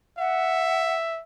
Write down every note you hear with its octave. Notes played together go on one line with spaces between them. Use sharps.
E5 F#5